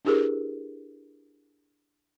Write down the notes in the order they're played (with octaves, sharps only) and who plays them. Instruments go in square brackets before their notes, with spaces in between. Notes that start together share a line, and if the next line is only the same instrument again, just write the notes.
[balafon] D4 E4 G4 G#4 A#4 B4